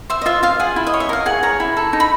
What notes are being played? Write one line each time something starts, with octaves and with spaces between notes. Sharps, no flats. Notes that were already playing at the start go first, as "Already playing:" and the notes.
C5 E5
D#5
F4 E5
F4 F5
G#4 F#5
E4
D#5
C#5
E5
A#4 F5
G#4 F#5
C#5 A#5
E4
A4
D#4
B5